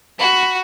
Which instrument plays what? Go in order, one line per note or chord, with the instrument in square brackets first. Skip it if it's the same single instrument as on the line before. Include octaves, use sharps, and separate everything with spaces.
[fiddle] F#4 [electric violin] B5